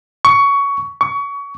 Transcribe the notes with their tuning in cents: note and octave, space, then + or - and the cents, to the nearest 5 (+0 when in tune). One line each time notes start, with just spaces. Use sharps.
C#6 +20
C#6 +30